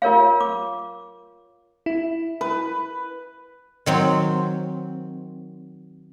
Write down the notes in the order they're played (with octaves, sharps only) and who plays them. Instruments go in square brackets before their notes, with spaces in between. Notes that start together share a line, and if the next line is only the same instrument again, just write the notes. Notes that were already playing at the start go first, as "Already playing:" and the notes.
[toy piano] F4 A#4 C#5 F5
D6
[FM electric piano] E4
[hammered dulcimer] B4
[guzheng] D#3 F#3 C4